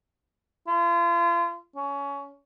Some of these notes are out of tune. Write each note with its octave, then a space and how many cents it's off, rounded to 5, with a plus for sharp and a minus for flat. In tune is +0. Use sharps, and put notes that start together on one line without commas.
F4 -35
C#4 +20